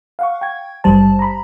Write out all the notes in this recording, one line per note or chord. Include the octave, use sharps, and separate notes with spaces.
F5 F#5 C#6
G5 G#6
G#1 G2 G3 C5 A5
A#5 B5